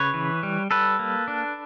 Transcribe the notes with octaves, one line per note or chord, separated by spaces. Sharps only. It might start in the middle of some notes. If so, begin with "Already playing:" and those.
Already playing: C#3 B4 C#5
E3
G3
G3 A4 B4
A#3
D4